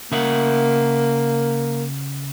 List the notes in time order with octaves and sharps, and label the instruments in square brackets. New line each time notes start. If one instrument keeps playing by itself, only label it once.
[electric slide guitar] C#3 E5 F#5 [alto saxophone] A#3